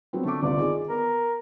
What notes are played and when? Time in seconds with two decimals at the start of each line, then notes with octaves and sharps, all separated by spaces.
0.13 F#3 B3 C4
0.25 D3 A3 D6
0.43 G1 C2 F4 D5
0.58 D#3 F4 G#4
0.90 B3 A#4